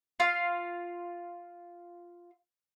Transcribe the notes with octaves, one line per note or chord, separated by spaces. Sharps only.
F4 F5